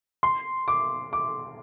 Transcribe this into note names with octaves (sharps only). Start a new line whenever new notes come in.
C6
D6
D6